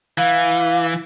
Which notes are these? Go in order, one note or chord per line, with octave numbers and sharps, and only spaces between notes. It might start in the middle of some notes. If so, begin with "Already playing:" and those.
E3 F5